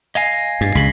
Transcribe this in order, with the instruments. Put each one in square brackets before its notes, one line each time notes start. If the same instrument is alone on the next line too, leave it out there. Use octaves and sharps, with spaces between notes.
[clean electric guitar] D#5 F5 G#5 [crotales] G#6 A#6 C7
[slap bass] G2
[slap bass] C#2 C#3 [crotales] B6 F#7